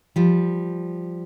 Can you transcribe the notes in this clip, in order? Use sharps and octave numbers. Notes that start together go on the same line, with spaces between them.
F3 G3